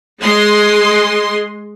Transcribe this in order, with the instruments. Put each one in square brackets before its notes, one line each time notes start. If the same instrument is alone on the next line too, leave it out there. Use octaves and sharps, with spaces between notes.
[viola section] G#3 D#5 C6